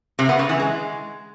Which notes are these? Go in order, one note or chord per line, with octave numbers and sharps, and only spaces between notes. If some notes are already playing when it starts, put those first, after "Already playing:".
C3
B3
C#3
E3
G#3